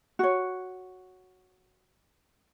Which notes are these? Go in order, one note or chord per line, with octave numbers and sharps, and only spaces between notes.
F#4 C#5